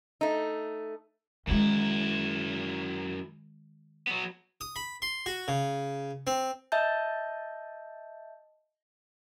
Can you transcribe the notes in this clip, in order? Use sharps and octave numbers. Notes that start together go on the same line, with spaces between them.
A3 D#4
F#2 D#3 G#3 E4
F#3 B3
D#6
B5
C6
F#4
C#3
C4
D#5 E5 A5 G6